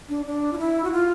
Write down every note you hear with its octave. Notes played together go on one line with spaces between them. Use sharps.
D4
D4
F4
E4
F#4
F4